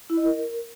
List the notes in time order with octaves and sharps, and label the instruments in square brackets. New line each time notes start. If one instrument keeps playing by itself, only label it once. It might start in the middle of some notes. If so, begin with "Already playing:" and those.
[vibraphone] E4
D#5
A#4